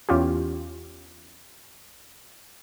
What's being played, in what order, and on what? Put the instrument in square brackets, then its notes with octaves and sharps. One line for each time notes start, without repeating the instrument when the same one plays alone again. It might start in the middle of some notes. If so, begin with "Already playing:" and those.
[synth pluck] E2 C#4 F4 G4